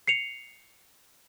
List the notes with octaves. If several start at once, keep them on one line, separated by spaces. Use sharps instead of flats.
C7 C#7 F7